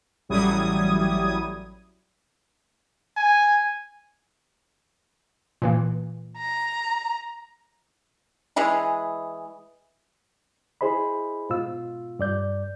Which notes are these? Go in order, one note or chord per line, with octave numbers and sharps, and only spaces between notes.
A1 F#3 G3 E4 D#6 G#6
G#5
A#2 E3 A#3
A#5
E3 G#3 E4 G#4
E4 G#4 C5 D#5 B5
G#2 B2 F4 E6
G2 D5 G6